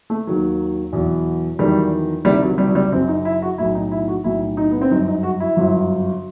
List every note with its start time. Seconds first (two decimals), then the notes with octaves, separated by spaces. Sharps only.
0.10 A3
0.27 D#2 D#3 F#3
0.93 E2 B2 F#3
1.59 E2 D#3 F#3 G3
2.25 C2 C3 D#3 G3
2.43 F#3
2.58 G3
2.68 F#3
2.75 G3
2.92 F#1 F#2 F#3 C4
3.08 D#4
3.25 E4
3.42 F#4
3.58 B1 A2 F#3 E4
3.75 D#4
3.91 E4
4.08 F#4
4.24 B1 A2 F#3 E4
4.57 D#4
4.71 B3
4.81 C4
4.91 G1 F#2 F#3 D#4
5.08 D#4
5.23 F#4
5.40 E4
5.57 G1 F#2 F#3